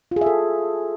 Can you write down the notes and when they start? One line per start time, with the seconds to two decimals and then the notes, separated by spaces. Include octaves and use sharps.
0.11 F4
0.16 G#4
0.21 E5
0.26 A4